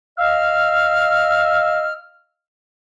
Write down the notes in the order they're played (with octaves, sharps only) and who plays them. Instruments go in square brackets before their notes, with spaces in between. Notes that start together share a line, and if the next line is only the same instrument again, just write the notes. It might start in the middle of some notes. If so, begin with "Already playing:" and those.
[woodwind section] D#5 F5 E6 F6